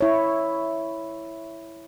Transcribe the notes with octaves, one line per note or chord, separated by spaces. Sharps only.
E4 C#5